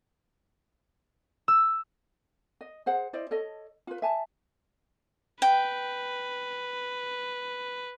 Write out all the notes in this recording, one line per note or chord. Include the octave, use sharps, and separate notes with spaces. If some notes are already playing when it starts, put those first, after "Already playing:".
E6
D#5
G#4 C5 F#5
E4 C5 D5 D#5
A4 C#5 D#5
F4 B4
E5 G#5 A5
B4 G5